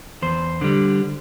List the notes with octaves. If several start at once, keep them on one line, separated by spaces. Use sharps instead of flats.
E2 C5
D3 G3